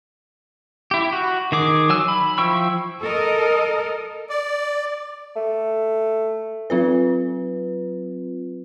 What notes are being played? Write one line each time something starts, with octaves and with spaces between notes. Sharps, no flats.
E4 G4
F#4
D#3 G#4 D6
F#3 G#5 E6
B5
F3 E4 G5 C#6 E6
A4 A#4 D#5
D5
A3
F#3 C4 F4 B4